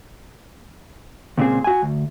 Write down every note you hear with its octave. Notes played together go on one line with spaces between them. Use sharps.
C#2 A#2 C4 G#4
F#4 G#5
D2